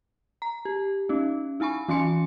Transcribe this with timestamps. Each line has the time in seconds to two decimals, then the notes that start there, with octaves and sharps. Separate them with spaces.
0.42 A#5
0.65 G4
1.09 C#4 D#4
1.60 D#4 E4 G#5 B5 C#6
1.88 E3 C#4 G#5 C6 C#7